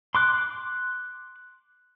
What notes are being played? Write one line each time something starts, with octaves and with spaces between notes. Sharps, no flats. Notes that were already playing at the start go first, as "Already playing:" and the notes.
C6 D6 F#6